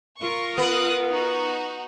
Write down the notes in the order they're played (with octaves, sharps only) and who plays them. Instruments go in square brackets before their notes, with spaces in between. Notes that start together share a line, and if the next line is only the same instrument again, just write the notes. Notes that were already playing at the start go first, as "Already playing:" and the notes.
[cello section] F4 A#4 [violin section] C#6
[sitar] B3 [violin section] D#6 F#6
[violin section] D#4 F#4